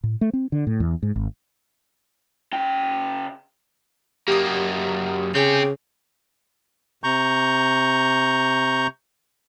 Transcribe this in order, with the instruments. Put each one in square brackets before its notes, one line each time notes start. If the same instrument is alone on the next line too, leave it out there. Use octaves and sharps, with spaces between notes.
[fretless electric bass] A2
A3
C4
D3
A2
E2
G#2
G#1
[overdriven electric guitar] C#3 G5
[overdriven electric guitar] F#2 A#3 [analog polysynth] G4 D#6
[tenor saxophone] C#3 [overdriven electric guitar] C4 G4 [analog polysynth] G#5 G6
[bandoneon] C3 A#5 C#6 G6